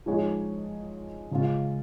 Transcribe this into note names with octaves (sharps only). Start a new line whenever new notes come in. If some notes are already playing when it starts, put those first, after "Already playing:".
F3 G#3 D#4 G#4 C#5
C#3 G#3 C#4 F4